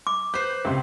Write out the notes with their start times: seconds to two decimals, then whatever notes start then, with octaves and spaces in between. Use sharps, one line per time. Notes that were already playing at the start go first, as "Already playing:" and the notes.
0.07 D6
0.34 B4 C5 G6
0.65 C#2 C3 C6